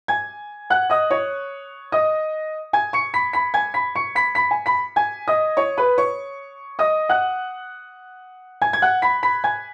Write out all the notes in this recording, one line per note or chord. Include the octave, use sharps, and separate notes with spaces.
G#5 G#6
F#5 F#6
D#5 D#6
C#5 C#6
D#5 D#6
G#5 G#6
C#6 C#7
B5 B6
B5 B6
G#5 G#6
B5 B6
C#6 C#7
B5 B6
B5 B6
G#5
B5 B6
G#5 G#6
D#5 D#6
C#5 C#6
B4 B5
C#5 C#6
D#5 D#6
F#5 F#6
G#5 G#6
G#6
F#5 F#6
B5 B6
B5 B6
G#5 G#6